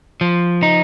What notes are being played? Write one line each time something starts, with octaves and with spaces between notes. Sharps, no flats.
F3
D#4